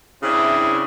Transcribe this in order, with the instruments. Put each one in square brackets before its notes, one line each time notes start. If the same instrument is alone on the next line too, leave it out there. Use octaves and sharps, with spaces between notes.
[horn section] C#3 C4 D4 E4